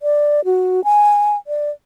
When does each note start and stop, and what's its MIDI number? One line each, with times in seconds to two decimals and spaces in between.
0.02 0.44 74
0.45 0.84 66
0.84 1.36 80
1.47 1.70 74